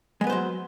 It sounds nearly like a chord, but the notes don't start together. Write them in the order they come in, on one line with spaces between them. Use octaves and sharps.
G#3 B3 B4 C5 F#3